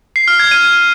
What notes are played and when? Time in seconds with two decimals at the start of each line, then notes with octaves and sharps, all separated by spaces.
0.16 C7
0.28 F6
0.40 G#6
0.51 D#7